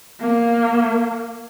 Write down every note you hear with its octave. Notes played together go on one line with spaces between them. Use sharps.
A#3